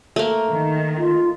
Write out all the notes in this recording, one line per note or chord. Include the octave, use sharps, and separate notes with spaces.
A3 A#3
D#3
F4